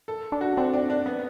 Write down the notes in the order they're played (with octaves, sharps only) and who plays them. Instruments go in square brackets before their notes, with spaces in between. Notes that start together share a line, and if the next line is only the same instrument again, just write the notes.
[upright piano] A4
[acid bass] D4
[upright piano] F#4
[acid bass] C4 [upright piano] D4
[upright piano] D4
D4
B3